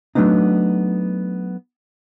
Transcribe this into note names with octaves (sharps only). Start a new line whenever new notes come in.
F#3 A3 B3 D4 D#4